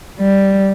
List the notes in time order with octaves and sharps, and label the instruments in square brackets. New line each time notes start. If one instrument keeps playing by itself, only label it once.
[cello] G3